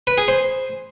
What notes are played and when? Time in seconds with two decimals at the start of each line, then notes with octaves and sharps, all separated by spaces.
0.07 B4
0.18 G#4
0.28 C5